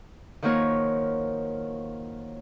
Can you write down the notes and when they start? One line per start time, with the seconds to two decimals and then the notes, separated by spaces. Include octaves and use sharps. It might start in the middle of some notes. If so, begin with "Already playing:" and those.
0.42 D#3 F3 F#3 A#3 A#4 C#5